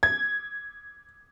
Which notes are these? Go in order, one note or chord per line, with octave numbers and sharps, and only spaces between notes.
G#6